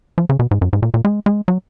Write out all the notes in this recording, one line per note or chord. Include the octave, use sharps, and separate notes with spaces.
F3
C#3
B2
G#2
F#2
G#2
A#2
A#2
G#3
G#3
F#3